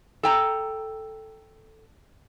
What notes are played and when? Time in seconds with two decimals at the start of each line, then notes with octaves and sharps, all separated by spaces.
0.23 A4 G5 A#5